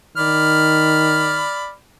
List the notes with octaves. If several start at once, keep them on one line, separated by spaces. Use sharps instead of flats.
D#3 D5 B5 F6